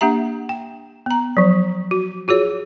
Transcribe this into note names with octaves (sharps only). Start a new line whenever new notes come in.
A#3 D4 G4 E5 A#5
G5
B3 A#5
F3 F#3
F#4
F4 F#4 G#4 C#5